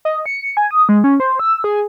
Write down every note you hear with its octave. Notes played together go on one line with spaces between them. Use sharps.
D#5
C#7
G#5
D#6
G#3
C#4
C5
E6
G#4